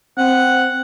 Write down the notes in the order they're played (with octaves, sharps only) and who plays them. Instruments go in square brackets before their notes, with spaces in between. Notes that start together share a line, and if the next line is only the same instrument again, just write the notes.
[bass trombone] C4 [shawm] F#5